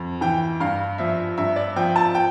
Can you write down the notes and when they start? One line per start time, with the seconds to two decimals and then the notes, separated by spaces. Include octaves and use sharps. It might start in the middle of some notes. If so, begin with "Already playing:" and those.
Already playing: F2
0.21 E3 G5
0.60 G2 F5
0.98 F3 E5
1.37 G2 E5
1.56 D5
1.76 F3 G5
1.96 A5
2.15 G5